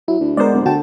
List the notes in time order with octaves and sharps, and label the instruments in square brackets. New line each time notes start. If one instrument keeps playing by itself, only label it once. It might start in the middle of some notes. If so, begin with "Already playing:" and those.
[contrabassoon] F#3 [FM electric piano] E4
[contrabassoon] D2
[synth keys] G#3 B3 C5 [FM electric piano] A#4 D5
[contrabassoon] D1
[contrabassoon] D2 [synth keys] D3 A5 [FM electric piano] F#4 G5